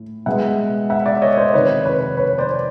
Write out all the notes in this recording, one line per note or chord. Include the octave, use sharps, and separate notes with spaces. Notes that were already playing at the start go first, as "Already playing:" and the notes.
Already playing: A2
B2 G#3 B3 E5 F#5
E5 F#5
D5 E5
C#5 D#5
C5 D5
F2 C3 D#3 B4 C#5
B4 C#5
B4 C#5
C5 D5